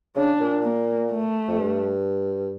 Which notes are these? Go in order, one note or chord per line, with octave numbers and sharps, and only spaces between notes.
C#3 D4
A#2
A#3
A3
F2
G2